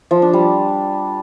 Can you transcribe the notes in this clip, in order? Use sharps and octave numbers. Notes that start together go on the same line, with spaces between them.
F3
D4
G3